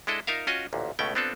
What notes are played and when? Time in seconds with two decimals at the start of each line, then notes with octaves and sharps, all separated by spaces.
0.07 G#3 D4 E4 A4 D#5
0.27 D#4 F4 A#4 E5 F5
0.47 C#4 F4 F#4 D#5 G#5
0.73 A1 D2 A#2
0.99 C#2 B2 A3 C#4 G5
1.15 B3 C4 D4 F4 A4